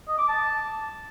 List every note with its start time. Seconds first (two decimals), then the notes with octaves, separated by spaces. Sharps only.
0.08 D#5
0.18 D6
0.29 A5